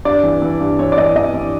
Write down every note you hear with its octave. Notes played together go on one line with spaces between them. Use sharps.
G2 D5
E3
E3
G2
E3 C#5
D5
E3 D#5
E3 D#5
E3